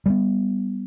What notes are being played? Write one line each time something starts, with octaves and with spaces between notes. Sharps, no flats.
G3 G#3 B3